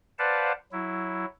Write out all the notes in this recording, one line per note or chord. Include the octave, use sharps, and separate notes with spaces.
B4 C5 D5 F5 F#5 A5
F#3 E4